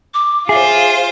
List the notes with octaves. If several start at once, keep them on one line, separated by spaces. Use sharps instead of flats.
D6
F4 G#4 C5 E5